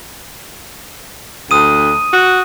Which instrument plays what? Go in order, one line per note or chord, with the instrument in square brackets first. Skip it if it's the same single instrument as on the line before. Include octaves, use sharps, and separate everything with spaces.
[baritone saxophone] D2 [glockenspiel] D#6 D#7
[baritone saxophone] F#4